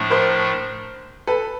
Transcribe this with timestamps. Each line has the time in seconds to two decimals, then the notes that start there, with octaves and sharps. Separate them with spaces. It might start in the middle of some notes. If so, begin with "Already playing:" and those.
Already playing: A2 F3 A3 D4
0.10 A#4 C5
1.27 A4 B4